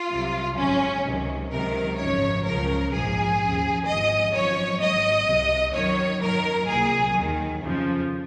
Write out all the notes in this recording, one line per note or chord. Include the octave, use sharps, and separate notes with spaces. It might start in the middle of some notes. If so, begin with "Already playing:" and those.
Already playing: F4
C2 C3 F#3
G#1 F#2 C#3 F#3 C#4
C#2 C3 D#3 F#3
C#2 C3 D#3 F#3 A#4
G#1 F#2 C#3 F3 C#5
C#2 C#3 F3 A#4
A#1 G#2 F3 G#4
D#2 C#3 F3
G#1 G#2 F3 D#5
G#1 F#2 F3 C#5
G#1 G#2 F#3 D#5
C2 C3 F#3
F#2 D#3 F#3 C#5
F#2 D#3 F#3 A#4
C2 A#2 F#3 G#4
D#2 D#3 F#3
F2 C#3 F3